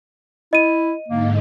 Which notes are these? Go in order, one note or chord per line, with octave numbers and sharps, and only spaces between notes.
E4 D#5 D#7
G#2 D3 A#3 D#4